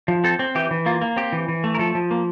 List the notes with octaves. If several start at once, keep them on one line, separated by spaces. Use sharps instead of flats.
F3
C4 A4
C4
E3 G4
E3
A#3 F4
A#3
C4 G4
E3
E3
A3
A#4
F3 A4
F3
A#3